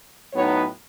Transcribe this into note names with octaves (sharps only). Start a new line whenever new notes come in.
A2 F#3 B3 D#4 C#5